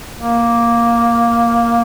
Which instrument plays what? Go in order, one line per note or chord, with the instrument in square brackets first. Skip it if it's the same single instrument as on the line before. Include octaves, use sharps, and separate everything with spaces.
[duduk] A#3